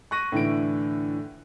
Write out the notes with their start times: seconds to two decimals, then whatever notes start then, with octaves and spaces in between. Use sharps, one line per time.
0.11 C#6 F#6 A#6 D#7
0.32 A2 D3 E3 D7